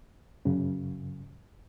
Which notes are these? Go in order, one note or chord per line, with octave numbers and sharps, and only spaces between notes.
F#2 C#3